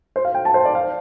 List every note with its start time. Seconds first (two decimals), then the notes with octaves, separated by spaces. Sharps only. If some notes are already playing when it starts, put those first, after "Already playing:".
0.16 C5
0.25 F5
0.34 G5
0.45 A5
0.54 C5
0.65 D5
0.75 F5